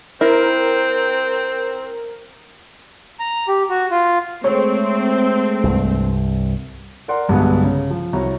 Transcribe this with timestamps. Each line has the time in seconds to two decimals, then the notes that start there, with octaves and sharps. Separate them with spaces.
0.21 C4 E4 A#4 G5
3.19 A#5
3.48 G4
3.70 F#4
3.91 F4
4.44 G#3 A3 C4 C#5
5.64 C2 G2
7.08 A#4 D5 F#5 C6
7.28 B1 G2 B2 D3 G#3 B3
7.64 C#3
7.90 F3
8.13 C2 F#4 C#5 A#5